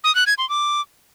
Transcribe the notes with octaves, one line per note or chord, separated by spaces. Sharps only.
D#6
F#6
G#6
C6
D6